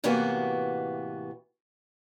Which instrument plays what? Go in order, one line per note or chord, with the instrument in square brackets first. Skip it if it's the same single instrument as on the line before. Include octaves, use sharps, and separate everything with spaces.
[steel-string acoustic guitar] A2 C3 E3 A#3 B3 F#4